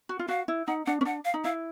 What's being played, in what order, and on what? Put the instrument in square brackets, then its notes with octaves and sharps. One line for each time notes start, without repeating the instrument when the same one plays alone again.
[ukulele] F#4
F4
[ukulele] F#4 [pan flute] F5
[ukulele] E4
[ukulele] D#4 [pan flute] F#5
[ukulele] D4 [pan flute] F#5
[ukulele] C#4
[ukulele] D4 [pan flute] F#5
[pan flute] F5
[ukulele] D#4
[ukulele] E4 [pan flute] F5